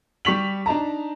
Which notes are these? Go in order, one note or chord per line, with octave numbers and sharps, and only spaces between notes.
G3 G4 C#6 B6 F7 F#7
D4 D#4 A5 A#5